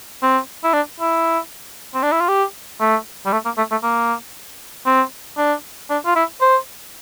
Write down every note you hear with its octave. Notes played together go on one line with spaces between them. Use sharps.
C4
E4
D4
E4
C4
D4
E4
F4
G4
A3
G3
A3
A#3
A3
A3
A#3
C4
D4
D4
F4
E4
C5